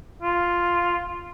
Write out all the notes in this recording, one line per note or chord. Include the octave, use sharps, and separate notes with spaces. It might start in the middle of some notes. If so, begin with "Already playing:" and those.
F4